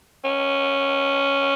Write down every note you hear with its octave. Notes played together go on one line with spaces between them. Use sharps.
C#4